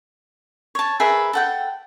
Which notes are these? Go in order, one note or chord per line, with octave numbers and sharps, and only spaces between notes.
C#5 A5
G#4 A#4 B4 E5
A4 F#5 G5